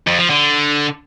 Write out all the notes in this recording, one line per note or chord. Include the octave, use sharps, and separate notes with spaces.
F2
F3
D3